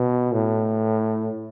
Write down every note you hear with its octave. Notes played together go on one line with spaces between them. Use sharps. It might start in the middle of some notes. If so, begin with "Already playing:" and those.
Already playing: B2
A2